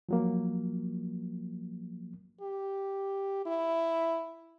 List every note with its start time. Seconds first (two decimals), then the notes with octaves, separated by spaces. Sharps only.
0.09 F3 F#3 A#3
2.41 G4
3.46 E4